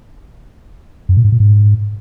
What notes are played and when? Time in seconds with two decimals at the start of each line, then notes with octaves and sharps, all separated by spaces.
1.09 F#2
1.17 A#2
1.24 G#2
1.32 A#2
1.40 G#2